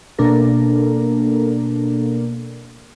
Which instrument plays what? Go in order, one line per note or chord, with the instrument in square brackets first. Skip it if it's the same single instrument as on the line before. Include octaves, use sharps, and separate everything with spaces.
[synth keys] B2 A#3 D4 A4 A#4